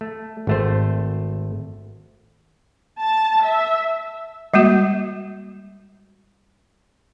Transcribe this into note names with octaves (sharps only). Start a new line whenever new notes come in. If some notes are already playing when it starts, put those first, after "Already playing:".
A3
G#1 A3 C5
A5
E5
G3 G#3 A#3 F#4